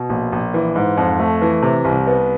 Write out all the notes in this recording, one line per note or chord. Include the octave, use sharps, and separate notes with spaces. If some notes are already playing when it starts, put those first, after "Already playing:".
Already playing: B2
A#1
A#1
E3
G#2
F2
A3
E3
C3
C2
B3